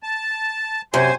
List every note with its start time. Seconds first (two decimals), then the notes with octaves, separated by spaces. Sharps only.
0.03 A5
0.94 F#2 C3 C5 G#5 C6